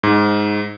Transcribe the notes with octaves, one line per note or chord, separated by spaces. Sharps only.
G#2